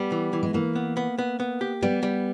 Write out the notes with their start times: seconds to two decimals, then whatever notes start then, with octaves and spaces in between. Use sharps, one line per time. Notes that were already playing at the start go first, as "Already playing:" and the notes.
Already playing: G3 B3
0.12 E3
0.33 E3
0.43 G#3
0.54 E3 A#3
0.76 B3
0.97 B3
1.19 B3
1.40 B3
1.61 G4
1.82 G3 B3
2.03 G3